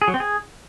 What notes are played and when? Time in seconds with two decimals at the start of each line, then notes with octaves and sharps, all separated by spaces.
0.02 G#4
0.08 F#3
0.14 C4
0.20 G#4